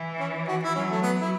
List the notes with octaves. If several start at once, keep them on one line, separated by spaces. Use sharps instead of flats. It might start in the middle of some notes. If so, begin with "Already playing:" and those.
Already playing: E3
C#4
F#4
E4
F#3 C#4
A3
B3
E4